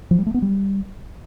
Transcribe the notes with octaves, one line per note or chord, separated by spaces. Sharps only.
F3
G3
A3
B3
G3